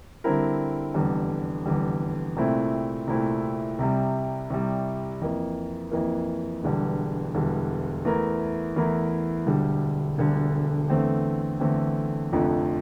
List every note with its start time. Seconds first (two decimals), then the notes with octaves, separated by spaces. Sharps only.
0.24 D3 G3 C4 E4 A#4
0.94 F1 E2 D3 G3
1.66 F1 E2 D3 G3
2.36 C2 A#2 A3 C4 E4
3.07 C2 A#2 A3 C4 E4
3.79 C2 C3 G3
4.50 C2 C3 G3
5.21 F2 E3 A#3
5.91 F2 E3 A#3
6.64 E1 E2 D3 G3
7.35 E1 E2 D3 G3
8.05 E2 E3 A3 E4 A#4
8.76 E2 E3 A3 E4 A#4
9.47 E1 D2 D3 G3
10.18 E1 D2 D3 G3
10.90 E2 D3 A3 C4
11.60 E2 D3 A3 C4
12.32 F1 F2 D3 F3 A3